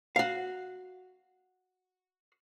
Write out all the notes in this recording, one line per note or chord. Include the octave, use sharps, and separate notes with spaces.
F#4 F5